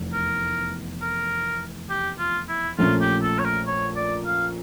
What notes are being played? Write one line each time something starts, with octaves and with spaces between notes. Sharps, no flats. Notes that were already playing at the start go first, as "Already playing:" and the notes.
Already playing: F1 E2 A3
A#4
A#4
G4
F4
E4
A#1 A#2 A3 C#4 F4
G4
A4
C#5
A#4
C#5
D5
F5